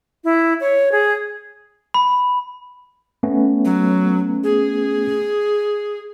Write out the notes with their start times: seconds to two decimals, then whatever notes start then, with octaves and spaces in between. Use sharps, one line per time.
0.24 E4
0.61 C#5
0.92 G#4
1.94 B5
3.23 A3 B3 C#4
3.65 F#3
4.44 G#4